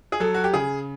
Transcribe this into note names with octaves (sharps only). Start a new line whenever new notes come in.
G#4
F#3 A4
F#4
G4
C#3 G#4